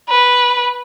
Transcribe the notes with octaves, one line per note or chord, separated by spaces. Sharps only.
B4